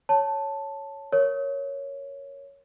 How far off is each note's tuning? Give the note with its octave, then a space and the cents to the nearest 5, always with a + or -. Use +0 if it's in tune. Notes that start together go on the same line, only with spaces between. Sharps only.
C#5 +0 A5 +0
A#4 +0 C#5 +0